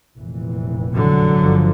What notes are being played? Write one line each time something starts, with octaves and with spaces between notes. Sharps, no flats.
F1 A#2 E3
D3 F#3
G1 G2 F3